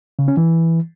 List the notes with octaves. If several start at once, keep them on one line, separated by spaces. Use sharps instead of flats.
C#3
C#4
E3